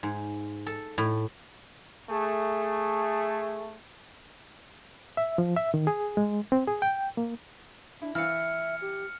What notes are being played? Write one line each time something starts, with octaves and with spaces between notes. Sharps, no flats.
G#2
A4
A2
A3 G#4
E5
F3
E5
D#3
G#4
G#3
C4
G#4
G5
A#3
D4 E4
E3 E5 F5 F6 C#7
G4